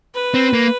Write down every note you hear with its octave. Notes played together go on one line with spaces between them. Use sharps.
B4
C4
A#3